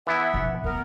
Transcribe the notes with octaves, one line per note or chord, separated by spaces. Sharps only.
E3 B3 E4 E5 F#5
B2 F3
F1 D2 B3 A#4